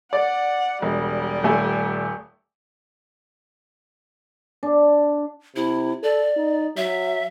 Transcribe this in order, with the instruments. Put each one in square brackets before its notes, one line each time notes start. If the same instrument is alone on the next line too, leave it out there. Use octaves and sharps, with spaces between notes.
[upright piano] D5 [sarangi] F#5
[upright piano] E1 [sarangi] G3
[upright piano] D#1 A3 G#5
[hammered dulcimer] D4
[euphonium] C3 [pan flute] E4
[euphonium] A4 [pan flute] D5
[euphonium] D#4
[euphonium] F#3 [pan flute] E5